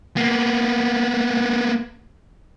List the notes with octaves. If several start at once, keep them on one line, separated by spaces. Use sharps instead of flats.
A#3 B3